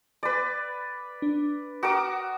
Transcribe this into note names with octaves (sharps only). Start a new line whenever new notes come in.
B4 D5
D4
F#4 A#4 D6 D#6